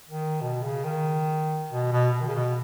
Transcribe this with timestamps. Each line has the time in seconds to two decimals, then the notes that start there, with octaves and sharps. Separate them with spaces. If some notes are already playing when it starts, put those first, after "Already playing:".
0.09 D#3
0.41 B2
0.63 C#3
0.84 D#3
1.71 B2
1.92 B2
2.13 B2
2.21 D#3
2.27 C#3
2.35 B2